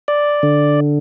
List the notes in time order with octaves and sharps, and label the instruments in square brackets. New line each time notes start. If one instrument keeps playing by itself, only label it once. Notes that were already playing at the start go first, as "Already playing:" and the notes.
[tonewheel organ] D5
D3